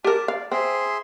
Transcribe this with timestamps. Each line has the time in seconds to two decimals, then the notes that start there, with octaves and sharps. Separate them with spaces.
0.04 G4 A#4 A5 D6
0.28 D5 F5
0.52 C4 G#4 E5 C6